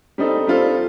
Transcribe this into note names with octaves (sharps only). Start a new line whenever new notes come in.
G3 C4 D#4 A4
G3 C4 F4 A4